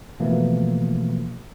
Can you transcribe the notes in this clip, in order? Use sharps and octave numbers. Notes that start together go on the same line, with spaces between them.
B2 E3 F3 A3 A#3